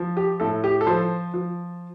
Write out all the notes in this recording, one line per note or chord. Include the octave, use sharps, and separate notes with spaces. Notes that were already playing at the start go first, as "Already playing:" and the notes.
Already playing: F3
G4
A2 A4
G4
A4
F3 C5
F3